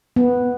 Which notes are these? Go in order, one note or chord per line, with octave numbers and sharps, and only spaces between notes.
B3